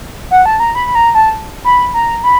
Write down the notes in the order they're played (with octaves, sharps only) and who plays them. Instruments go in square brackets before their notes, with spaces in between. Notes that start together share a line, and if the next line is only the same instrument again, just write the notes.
[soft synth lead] F#5
A5
A#5
B5
B5
A#5
A5
B5
A#5
B5